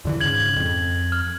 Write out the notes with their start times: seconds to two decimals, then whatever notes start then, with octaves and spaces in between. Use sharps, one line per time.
0.05 E2 D3 E3
0.21 G#2 C#3 G#6 F#7
0.56 F2
1.12 F6